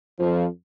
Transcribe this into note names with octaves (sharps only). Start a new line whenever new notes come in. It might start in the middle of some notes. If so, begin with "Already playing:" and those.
F2 F3